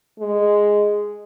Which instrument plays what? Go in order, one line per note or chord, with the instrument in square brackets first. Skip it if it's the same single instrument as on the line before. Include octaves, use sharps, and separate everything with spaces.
[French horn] G#3